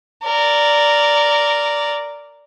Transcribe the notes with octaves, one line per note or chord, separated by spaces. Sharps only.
A#4 D5